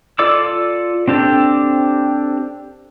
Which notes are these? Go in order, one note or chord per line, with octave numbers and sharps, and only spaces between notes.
F4 A4 D5 D6 E6
C4 D4 G4 A4